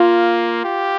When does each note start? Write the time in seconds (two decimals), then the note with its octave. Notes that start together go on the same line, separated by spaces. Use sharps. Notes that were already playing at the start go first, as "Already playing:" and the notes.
Already playing: A#3 F4
0.64 G4